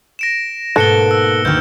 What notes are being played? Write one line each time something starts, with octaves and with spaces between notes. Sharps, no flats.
A#6 D7 E7
G#2 B2 A#3 A4 F#6 C#7 G7
E6
D2 D#3 G4 F6 G6